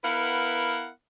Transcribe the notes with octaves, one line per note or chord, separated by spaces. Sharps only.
B3 E4 A#4 B4 F5 F#5